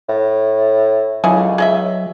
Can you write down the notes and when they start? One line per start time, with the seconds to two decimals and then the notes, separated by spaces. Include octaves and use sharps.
0.09 A2
1.24 C#2 D3 F#3 E4 G#4
1.58 G#4 D#5 E5